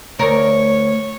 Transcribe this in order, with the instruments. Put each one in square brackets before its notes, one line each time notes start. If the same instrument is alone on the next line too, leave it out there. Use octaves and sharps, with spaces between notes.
[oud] D2 A#4 [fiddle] C#5